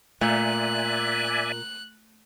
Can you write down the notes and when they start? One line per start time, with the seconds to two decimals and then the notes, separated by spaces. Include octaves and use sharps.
0.21 A#2 A3 D5 E5 G#5 F#6